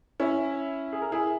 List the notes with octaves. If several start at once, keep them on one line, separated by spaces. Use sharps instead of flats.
C#4 E4
G#4
A#4
E4 G#4